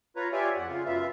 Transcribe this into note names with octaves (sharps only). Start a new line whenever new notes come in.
F4 B4 C#5 A#5
F4 G4 C#5 D5 E5 G#5
F2 F#5
C#3 F4
F#2 B3 F4 E5